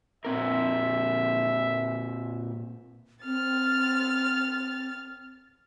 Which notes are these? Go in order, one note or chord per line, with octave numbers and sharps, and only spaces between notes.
A#2 C4 A#4 E5
C4 F6 A6